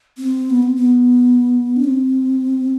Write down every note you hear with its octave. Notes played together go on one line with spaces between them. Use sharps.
C4
B3
C4
B3
D4
C4